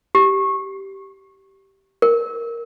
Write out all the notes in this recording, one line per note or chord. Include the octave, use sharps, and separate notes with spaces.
G4
A#4